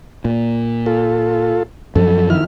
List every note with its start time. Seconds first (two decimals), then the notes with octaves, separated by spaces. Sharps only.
0.25 A#2
0.86 F4 A4
1.96 F#2 F3 F#3 A4
2.30 D#3 E4 F6